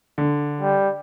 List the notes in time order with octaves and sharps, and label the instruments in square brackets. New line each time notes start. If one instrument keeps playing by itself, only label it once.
[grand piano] D3
[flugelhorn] G3